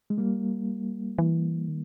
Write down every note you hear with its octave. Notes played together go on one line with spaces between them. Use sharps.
G#3
G3 A#3
E3
D#3